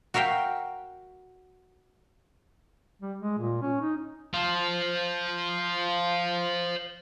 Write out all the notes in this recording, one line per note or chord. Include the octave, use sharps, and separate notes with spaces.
F#4 A#4 E5 F5 G5
G3
G#3
A#2
C#4
D#4
C5 F5